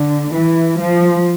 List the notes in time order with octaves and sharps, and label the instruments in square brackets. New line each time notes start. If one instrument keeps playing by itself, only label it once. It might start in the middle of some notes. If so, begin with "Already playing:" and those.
Already playing: [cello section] D3
E3
F3